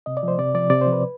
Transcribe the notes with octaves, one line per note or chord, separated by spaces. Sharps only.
C3 D#5
D5
F3 C5
C3 D5
F3 D5
C3 D5
C5
F3
B4